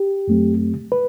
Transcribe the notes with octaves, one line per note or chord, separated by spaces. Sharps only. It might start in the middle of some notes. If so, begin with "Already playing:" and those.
Already playing: G4
F#2 F#3 A3 C4
B4